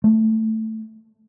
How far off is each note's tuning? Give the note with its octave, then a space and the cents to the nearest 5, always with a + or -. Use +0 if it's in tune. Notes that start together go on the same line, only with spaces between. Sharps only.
A3 +5